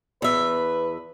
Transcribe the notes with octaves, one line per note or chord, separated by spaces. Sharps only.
E2 B4 E5